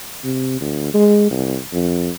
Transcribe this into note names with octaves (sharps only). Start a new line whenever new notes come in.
C3
D2
G#3
C2
F2